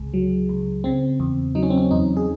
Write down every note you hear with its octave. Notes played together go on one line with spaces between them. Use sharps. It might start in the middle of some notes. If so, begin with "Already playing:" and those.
Already playing: C#2 C3 G#4
F#3
C#2
C#3 C4
E2
F#3 D#4
C#4
C4
C#4
E2 D#4
G#4